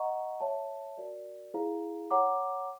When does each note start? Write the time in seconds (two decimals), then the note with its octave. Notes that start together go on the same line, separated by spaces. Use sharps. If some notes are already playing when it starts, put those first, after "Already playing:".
Already playing: D#5 F#5 A#5 C#6
0.40 C#5 E5 A5
0.97 F#4 A#4 D5
1.54 E4 G#4 C5 F5 A#5
2.11 C#5 F#5 A#5 D6